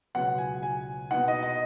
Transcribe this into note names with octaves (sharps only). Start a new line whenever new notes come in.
C#2 B2 F#3 B3 F#5
G#5
G#5
B2 B3 D#4 F#5
D#5
D#5